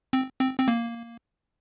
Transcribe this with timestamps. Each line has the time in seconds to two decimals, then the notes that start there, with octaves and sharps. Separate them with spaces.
0.13 C4
0.40 C4
0.59 C4
0.68 A#3